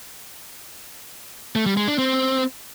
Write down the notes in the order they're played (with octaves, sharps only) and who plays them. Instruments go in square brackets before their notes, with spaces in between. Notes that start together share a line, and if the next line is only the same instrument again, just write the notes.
[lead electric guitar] A3
G3
G#3
D4
C4